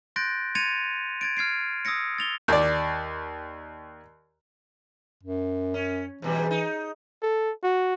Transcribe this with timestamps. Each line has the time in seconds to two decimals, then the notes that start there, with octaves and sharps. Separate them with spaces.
0.16 C6 F#6 G6 A6 A#6 D7
0.55 C6 G#6 A6 C#7 D#7 F7
1.21 G#6 A6 D7
1.37 F6 G#6 C7 D7
1.85 D#6 E6 G#6 A#6 C#7
2.18 A6 F7 G7
2.48 D#2 D5
5.23 F#2
5.74 C#4
6.22 G#2 B2 E3 G3
6.51 D#4
7.22 A4
7.63 F#4